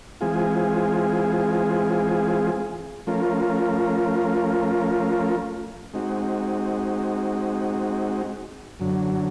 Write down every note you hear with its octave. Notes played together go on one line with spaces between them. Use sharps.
E3 G#3 C4 F4 G#4
F3 A3 C#4 F4 A#4
G#3 C4 D#4 F#4
F#2 D3 F#3